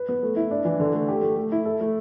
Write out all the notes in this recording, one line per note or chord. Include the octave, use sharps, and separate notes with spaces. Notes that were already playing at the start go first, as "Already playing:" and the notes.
Already playing: B4
B3
A3
E4
D4
E3
D3
A3
G4
A3
A3
E4
A4
A3